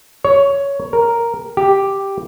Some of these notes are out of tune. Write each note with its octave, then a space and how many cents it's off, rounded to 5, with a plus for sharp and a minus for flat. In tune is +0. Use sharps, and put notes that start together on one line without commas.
C#5 +10
A#4 +0
G4 +0